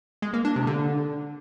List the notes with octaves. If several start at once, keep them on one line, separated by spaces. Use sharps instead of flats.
G#3
A#3
D4
C3
D3